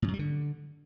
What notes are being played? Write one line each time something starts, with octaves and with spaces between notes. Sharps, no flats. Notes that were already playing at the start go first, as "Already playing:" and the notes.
A2
F#2
G3
D3